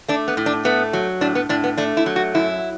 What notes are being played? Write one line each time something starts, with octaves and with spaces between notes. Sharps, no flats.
A3 D4
B3
A2
D4
A3 B3
F#3
A2 D4
B3
A2 D4
B3
A3 D4
E4
F#3
F#4
F#2 E4